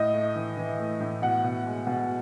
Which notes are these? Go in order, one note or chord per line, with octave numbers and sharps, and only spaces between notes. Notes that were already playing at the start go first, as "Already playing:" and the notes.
Already playing: A2 D#5
A3
E3
E3
A3
A2
B2 F#5
B2
G#3
B2